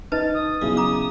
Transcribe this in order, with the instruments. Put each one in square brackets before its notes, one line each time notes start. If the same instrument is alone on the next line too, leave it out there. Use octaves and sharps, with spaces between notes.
[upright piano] D#4 [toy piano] B4 D#5 A5 [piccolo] A6
[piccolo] D#6
[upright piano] B1 E4 [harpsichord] C#3
[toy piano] A#5 D6 [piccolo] D#6